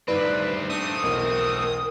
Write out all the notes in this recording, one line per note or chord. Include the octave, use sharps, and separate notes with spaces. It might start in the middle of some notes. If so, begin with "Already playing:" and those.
D2 G2 D#3 C4 B4 D5
A3 C4 D4 D#6
B1 E2 A#4